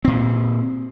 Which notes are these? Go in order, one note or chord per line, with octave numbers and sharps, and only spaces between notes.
A#2 C4